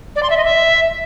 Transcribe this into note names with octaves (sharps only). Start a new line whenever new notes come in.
D5
C6
E5
D#5
E5